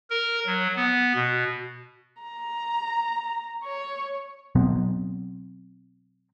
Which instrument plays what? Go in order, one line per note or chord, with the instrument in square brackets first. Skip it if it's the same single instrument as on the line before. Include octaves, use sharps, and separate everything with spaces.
[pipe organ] A#4
F#3
B3
B2
[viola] A#5
C#5
[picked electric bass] B2 F#3 B3 C4